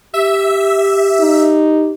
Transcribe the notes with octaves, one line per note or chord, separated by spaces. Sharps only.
G4 E5
D#4